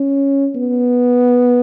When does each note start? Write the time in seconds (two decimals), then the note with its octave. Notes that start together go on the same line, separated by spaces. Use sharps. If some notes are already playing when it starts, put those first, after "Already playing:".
Already playing: C#4
0.55 B3